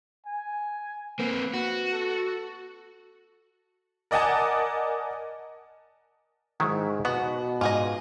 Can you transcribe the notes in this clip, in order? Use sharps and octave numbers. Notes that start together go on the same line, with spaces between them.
G#5
A#3 C4 B4
F#4
A4
A#4 D5 D#5 F#5 G#5 A5
G#2 D#3 F#3 E4
B2 B3 F#4
G#2 F4 G#4 D#5